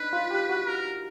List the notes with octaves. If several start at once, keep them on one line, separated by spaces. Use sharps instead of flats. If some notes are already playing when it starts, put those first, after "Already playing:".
Already playing: D4 D#4 B4
F4
G4
F#4
A#4